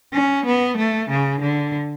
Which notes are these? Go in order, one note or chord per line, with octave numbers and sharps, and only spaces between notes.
C#4
B3
A3
C#3
D3